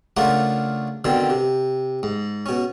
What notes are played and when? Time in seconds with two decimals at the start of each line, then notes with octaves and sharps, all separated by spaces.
0.17 C#3 A3 D4 F4 A#4 F#5
1.05 B2 D3 D#3 C4
1.30 C3
2.03 G#2
2.46 B2 C#4